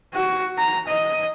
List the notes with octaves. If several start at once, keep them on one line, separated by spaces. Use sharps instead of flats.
F#4
A#5
D#5